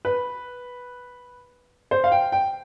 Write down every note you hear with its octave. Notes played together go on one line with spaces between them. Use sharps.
B4
C5
F5
G5
G5